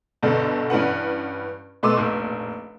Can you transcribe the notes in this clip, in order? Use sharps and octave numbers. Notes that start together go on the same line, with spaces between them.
G1 G2 B2 D3 A4
G2 E3 C#4 B4 F#5
B2 A3 B4 C6 D6 E6
F1 A#1